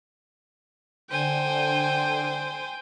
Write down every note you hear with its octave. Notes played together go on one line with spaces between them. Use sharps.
D3 C5 G5 G#5